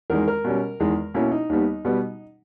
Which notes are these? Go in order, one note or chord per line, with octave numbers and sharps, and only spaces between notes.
E2 D#3 G#3 A#4
A#4
B2 G3 C#4
E2 D#3 G#3
B2 A#3 C#4 E4
D#4
D#2 D#3 G3 B3
B2 G3 B3